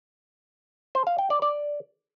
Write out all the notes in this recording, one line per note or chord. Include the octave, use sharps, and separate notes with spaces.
C5
F5
G5
D5
D5